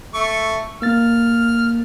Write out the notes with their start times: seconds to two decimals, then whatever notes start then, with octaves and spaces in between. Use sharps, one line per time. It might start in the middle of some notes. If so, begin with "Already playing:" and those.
0.14 A3 C#6
0.82 A#3 F6 A6